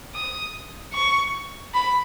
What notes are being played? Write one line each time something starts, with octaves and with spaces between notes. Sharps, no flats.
D#6
C#6
B5